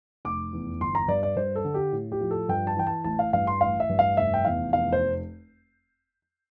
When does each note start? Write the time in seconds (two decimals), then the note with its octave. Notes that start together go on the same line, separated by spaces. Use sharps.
0.25 F1 D6
0.53 E2
0.80 G1 C6
0.95 A#5
1.08 G2 D5
1.23 D5
1.36 G2 C5
1.56 A4
1.65 D3
1.74 G4
1.93 A2
2.12 G4
2.21 F3
2.31 A4
2.49 G2 G5
2.67 A5
2.77 E3 G5
2.87 A5
3.04 A1 A5
3.19 F5
3.33 G2 F5
3.47 C6
3.61 A1 F5
3.80 E5
3.89 G2
3.99 F5
4.17 F1 E5
4.34 G5
4.45 E2 F5
4.73 F1 F5
4.93 C5